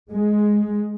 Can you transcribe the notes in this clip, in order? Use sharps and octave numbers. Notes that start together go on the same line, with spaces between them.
G#3